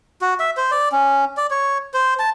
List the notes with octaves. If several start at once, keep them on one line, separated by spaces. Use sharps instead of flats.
F#4
E5
C5
D5
C#4
D5
C#5
C5
A5